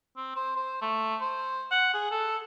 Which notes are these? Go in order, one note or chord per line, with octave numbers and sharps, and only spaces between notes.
C4
C5
C5
A3
C5
F#5
G#4
A4